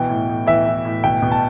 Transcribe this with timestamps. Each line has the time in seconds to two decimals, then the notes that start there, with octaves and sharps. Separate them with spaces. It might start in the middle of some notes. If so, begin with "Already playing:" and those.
Already playing: B2 E3 G5
0.09 A2
0.28 A2
0.47 E3 E5
0.66 E3
0.85 A2
1.04 B2 G5
1.22 B2
1.32 A5